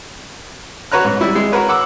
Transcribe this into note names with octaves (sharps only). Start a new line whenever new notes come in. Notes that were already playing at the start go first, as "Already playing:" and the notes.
F#4 B4 C#5 A#5 F#6
G#2
G3 E4
G#3
F#4 A#4 B4 C#5
F#5 D6 E6